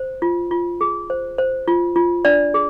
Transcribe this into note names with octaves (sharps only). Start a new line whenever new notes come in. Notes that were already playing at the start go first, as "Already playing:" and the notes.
Already playing: C5
F4
F4
G#4
C5
C5
F4
F4
D4 D5
G#4